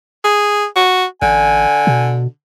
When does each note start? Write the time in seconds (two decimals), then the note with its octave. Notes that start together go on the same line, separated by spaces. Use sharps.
0.25 G#4
0.76 F#4
1.22 A1 D3 G#5
1.87 B2